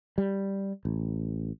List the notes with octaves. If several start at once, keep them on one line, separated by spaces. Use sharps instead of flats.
G3
A1